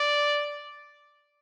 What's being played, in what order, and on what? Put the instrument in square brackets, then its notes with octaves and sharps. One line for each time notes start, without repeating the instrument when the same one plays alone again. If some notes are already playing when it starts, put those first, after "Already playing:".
Already playing: [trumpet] D5